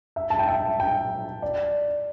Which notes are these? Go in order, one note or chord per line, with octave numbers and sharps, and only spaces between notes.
E5
A5
G5
E5
G5
D5